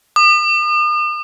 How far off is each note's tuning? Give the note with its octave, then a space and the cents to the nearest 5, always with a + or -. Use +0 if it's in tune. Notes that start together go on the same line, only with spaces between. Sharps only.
D#6 -45